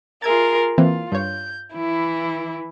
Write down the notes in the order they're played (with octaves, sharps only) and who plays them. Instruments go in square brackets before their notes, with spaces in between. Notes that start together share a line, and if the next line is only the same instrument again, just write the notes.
[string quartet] F4 G#4 A#4 [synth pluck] E5 G#6 A6
[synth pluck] E3 A#3 C4 [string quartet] F4
[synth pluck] G2 C#5 [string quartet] G6
[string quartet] E3 E4